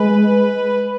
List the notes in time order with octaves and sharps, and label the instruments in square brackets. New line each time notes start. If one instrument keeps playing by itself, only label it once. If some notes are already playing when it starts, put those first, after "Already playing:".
Already playing: [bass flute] G#3 [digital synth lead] B4